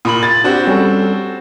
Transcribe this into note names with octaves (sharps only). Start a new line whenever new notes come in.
A#2 B5 D#6 F#7
A6
C4 D4 F#4 G4
G3 C#4 A4